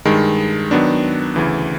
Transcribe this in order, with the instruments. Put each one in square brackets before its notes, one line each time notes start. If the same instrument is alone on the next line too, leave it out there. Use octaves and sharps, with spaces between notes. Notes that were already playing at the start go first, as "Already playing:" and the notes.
[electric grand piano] G2 D#3 G#3
D#3 F#3 B3 D4
D2 C#3 E3